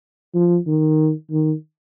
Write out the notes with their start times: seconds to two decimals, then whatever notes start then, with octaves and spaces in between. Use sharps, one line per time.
0.35 F3
0.67 D#3
1.31 D#3